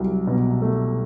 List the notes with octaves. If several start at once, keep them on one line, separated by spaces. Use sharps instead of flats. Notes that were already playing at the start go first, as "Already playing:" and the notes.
Already playing: C2 F#3
B2
A3